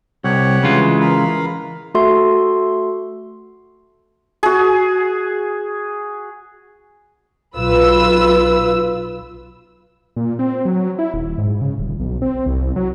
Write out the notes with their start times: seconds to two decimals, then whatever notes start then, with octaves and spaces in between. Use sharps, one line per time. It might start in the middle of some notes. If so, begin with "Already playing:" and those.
0.24 C2 G4 C#5 F#5
0.63 C#3 E3 G#3 F4
1.01 A#4 F5 B5
1.94 A3 F#4 A4 E5 C6
4.43 F#4 G#4
7.57 B1 F4 B4 E6
10.16 A#2
10.39 C4
10.65 F#3
10.99 E4
11.14 D#1
11.38 G#2
11.61 C#3
11.79 D#1
12.00 B1
12.22 C4
12.46 C2
12.76 F#3